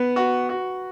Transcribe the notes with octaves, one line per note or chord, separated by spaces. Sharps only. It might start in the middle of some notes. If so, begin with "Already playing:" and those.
Already playing: B3 B4
F#4
F#4